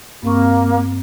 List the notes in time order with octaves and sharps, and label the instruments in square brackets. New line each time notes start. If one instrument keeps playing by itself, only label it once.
[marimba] G2 C4 C#6 [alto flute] A#3